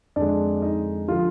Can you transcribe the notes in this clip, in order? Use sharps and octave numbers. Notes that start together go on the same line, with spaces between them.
F2 D3 G#3 D4 D5
D#4 D#5
D3 F3 F4